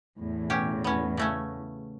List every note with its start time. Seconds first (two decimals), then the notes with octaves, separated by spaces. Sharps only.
0.18 E2 A2
0.50 B2 C#4 G4
0.84 B3 C#4
1.17 C#3 A3 C#4